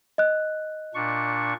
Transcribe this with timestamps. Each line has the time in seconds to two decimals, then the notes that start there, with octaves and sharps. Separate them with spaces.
0.18 D#5 F#6
0.95 A#2 D4 C#6